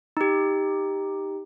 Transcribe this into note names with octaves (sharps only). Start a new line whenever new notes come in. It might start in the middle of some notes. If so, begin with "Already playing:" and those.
D#4 G4